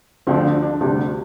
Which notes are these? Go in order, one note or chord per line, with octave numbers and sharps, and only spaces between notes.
D2 D3 F3 C4
D4
D4
D2 C3 G3 D4